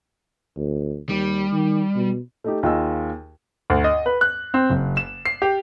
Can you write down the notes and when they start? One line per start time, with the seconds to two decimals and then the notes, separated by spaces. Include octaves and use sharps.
0.57 D2
1.09 D#2 G3
1.52 D#3
1.96 B2
2.44 A3 D#4 G4
2.63 D#2 F4 G#4 D#5 G#5 E6
3.70 D2
3.84 D#5
4.06 B4
4.21 F#6
4.54 C4
4.70 F#1
4.97 E7
5.25 C7
5.42 G4